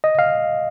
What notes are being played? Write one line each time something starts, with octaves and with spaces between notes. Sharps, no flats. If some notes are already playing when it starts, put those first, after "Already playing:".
D#5
F5